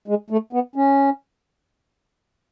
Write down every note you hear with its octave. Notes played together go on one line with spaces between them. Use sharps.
G#3
A3
B3
C#4